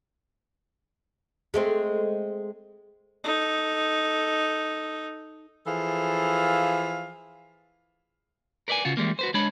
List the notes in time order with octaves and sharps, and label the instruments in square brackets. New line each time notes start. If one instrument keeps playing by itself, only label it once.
[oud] G#3 A3 C4
[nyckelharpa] D#4 A4
[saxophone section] E3 F3 G#4 A4 F5
[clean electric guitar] A#4 B4 D5 D#5 G#5
C#3 F4 F#4
E3 G3 G#3 A#3
F#4 B4 C5
G#3 D4 C#5 B5